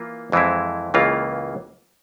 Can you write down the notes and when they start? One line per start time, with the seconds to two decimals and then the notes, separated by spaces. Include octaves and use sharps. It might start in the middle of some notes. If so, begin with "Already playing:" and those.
Already playing: E3 A#3 F4
0.32 F2 E3 G#3 C4 E4
0.94 C#2 C#3 E3 A#3 F4